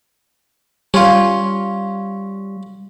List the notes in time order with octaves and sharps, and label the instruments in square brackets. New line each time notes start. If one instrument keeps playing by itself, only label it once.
[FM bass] G3 [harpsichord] C#4 F4